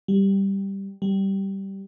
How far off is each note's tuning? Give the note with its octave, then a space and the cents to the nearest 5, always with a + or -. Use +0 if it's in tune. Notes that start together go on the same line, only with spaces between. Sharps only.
G3 +0
G3 -10